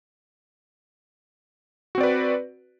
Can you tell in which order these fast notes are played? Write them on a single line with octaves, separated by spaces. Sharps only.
F#4 C4 D5 B4